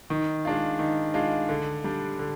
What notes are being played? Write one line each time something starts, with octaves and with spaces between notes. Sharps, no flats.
D#3
G#3 D4 F4
D#3
G#3 D4 F4
D3
G3 D4
D3